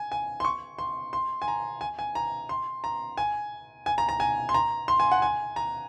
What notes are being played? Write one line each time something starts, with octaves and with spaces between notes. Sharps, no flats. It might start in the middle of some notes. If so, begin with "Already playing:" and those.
Already playing: G#5
G#5
C6
C#6
C6
C6
G#5
A#5
G#5
G#5
A#5
C6
A#5
G#5
G#5
A#5
A#5
G#5
C6
A#5
C6
G#5
F#5
G#5
A#5